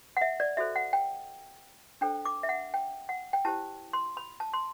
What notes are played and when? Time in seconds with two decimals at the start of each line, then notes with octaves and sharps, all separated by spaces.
0.17 F#5
0.21 E5
0.40 D5
0.57 F#4 A4 C5 E5
0.76 F#5
0.93 G5
2.01 D4 A4 C5 G5
2.25 D6
2.43 E5
2.49 F#5
2.74 G5
3.09 F#5
3.33 G5
3.45 E4 G4 C5 A5
3.93 C6
4.17 B5
4.40 A5
4.53 C6